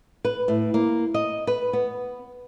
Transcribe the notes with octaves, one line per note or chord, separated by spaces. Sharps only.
B4
A2
A#3
D#5
B4
B3